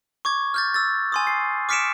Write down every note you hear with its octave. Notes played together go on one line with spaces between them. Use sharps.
C#6 D6 G#6
F6 G6 A6
E6 A6
G#5 C6 D#6
C7
D6 F6 B6 C#7 D7 E7